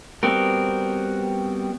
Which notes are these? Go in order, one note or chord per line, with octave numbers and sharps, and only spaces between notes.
G3 B3 C4 F#4 A#4